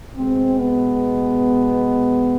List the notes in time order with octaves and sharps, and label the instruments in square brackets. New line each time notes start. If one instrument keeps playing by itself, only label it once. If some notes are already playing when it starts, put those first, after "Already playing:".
[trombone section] B2 G#3 C4
B3